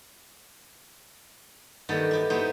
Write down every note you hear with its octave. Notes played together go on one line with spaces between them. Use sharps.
G2 D#3 B3 G4 A4
E4 G4
B3 D#4 E4 G4 C5